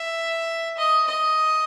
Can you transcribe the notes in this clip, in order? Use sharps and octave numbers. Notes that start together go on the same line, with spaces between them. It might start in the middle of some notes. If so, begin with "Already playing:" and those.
Already playing: E5
D#5
D#5